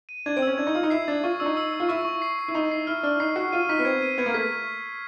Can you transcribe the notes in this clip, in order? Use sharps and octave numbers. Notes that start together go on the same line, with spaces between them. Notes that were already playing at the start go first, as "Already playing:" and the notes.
D#7
D4 G#6
C4
C#4 E6
D4 G#6
D#4
F4 E6
D#4
E4 C7
D4 A6
F4 C#6
D4 E6
D#4
E6
E6
F4
E4 C#6
C#6
C7
C7
E4
D#4 C7
C7
E4 F6
D4 F6
D#4 C7
F#4 C7
F4 D#7
D#4 B6
B3
C4 G#6
D#7
B3 G#6
A#3
A3 B6